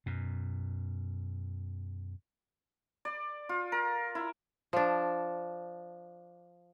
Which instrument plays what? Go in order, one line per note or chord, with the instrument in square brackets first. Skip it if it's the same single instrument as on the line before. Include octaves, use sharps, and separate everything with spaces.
[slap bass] F#2 B2
[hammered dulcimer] D5
F4
A#4
E4
[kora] F3 D4